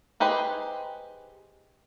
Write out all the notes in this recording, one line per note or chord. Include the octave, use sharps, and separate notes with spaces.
D#4 G4 G#4 B4 C5